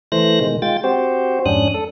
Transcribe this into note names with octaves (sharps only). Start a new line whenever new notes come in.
E3 A3 C5 F#6 A#6
B2 D#3 G#3
G#3 F4 G5 A6
C4 F#4 G4 C5
F2 G#2 C#4 D4 D#6 F#6
A4